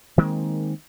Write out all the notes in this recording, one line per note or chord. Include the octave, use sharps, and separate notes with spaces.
D#3 G#3 A#3 C4